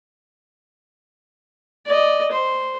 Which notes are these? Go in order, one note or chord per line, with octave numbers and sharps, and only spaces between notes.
D5 D#5
C5